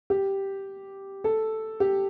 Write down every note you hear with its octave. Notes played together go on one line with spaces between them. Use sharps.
G4
A4
G4